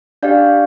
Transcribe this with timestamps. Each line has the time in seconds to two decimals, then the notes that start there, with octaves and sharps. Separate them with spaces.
0.23 D4 G4 D5 F5